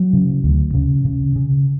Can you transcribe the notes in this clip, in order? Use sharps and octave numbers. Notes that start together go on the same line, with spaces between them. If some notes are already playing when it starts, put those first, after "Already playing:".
Already playing: F#3
C#3
D2
C#3
C#3
C#3